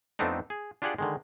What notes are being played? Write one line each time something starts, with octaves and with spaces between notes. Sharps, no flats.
F2 A3 B3 C4 D4 D#4
G#4
D4 F4 G4 G#4 D5 F#5
D3 D#3 G#3